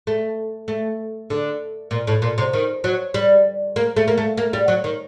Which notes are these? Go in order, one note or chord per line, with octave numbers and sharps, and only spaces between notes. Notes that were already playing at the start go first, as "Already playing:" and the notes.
A3
A3
D3
A#2
A2
A#2
C3
D#3
F#3
G3
A#3
A3
A#3
A3
A#3
G3
F#3
D#3